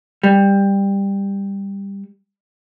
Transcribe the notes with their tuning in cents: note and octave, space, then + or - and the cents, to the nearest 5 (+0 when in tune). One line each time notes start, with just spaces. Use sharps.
G3 +15